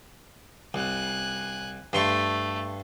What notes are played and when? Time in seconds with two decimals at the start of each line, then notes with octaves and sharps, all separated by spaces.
0.74 C2 G#5 F#6
1.93 G2 A3 C6 C#6